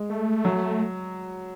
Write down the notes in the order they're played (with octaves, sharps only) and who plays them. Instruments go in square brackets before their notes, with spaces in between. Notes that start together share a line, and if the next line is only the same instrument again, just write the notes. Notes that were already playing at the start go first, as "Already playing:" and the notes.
Already playing: [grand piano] G#3
[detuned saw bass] A3
[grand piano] F#3